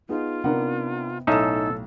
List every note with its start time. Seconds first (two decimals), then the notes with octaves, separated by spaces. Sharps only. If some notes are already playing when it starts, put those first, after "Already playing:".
0.09 B3 D#4 F4 G#4
0.44 C3 B3 D4 D#4 A#4 F#5
1.27 B1 A2 C#4 D#4 A4 E5 A5 E7